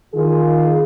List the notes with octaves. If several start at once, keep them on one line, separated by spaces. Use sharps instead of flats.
D#3 F4 G#4